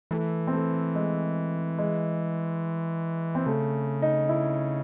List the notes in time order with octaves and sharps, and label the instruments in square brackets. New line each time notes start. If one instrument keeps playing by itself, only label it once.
[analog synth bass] E3 [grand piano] A3
[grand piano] C4
A3
G#3
G#3
C4
[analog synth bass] C#3 [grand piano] A3
[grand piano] D#4
E4